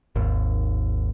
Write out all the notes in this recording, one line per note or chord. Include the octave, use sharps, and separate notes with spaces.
G#1 D#2